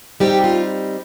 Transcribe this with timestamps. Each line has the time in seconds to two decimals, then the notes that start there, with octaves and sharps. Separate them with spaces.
0.20 G3 C4 D#4 G4
0.44 F4